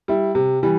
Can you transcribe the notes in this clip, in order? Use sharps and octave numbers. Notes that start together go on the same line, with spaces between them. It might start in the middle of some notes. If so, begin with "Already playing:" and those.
G3 E4
C3
E3 G3